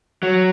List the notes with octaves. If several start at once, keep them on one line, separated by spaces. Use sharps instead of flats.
F#3